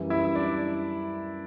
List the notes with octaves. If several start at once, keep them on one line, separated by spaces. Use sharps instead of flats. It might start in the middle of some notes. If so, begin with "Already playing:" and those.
Already playing: F#2 E3 G3
E4 E5
D4 D5